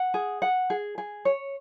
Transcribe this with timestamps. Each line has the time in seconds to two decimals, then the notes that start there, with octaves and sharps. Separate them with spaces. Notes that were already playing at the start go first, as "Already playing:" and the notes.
Already playing: F#5
0.14 G#4
0.42 F#5
0.70 G#4
0.98 G#4
1.25 C#5